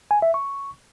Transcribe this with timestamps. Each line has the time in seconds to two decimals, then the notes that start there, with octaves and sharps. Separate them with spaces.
0.11 G#5
0.22 E5
0.34 C#6